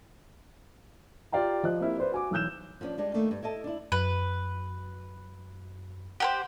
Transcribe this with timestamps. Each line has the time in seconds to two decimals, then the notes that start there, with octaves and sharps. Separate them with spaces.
1.32 F4 G4 D5 F5 G5 A#5
1.63 F3 D#5 F#6
1.81 A#3 C4 E4 G4
1.98 B4 C5 D5
2.12 F#4 G#5 D6
2.31 B1 E3 E6 F#6 G6 E7
2.81 F3 B3 C#4 D4
2.98 G3 G#3 D4
3.14 D#3 A3 A#3 D4
3.31 G2
3.43 E4 A4 D#5 A5
3.64 D4 E4
3.92 F#2 B4
6.20 G4 A#4 C5 F#5